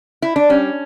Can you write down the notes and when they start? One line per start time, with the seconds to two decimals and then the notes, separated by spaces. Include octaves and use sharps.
0.22 E4
0.36 D4
0.49 G3 C#4